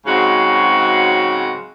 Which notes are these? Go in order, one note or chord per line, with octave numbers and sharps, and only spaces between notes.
G#2 C#3 F#3 G#3 C4 F#4